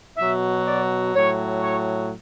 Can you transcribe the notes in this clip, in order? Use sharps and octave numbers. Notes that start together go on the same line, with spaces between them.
B2 F#3 E5
D5
A2 F#3 C#5
C#5